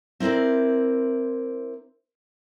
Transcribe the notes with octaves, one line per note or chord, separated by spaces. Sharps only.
C4 E4 A#4 C5 D5